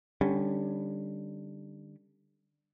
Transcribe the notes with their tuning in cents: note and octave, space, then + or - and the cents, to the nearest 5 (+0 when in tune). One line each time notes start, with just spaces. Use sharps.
D3 +20 G3 +15 C#4 +0